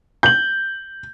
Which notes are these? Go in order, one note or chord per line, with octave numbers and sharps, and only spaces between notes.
G6 F#7